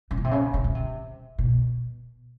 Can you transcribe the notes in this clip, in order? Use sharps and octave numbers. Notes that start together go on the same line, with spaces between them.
C#3
B2
C3
C#3
C3
C#3
C3
B2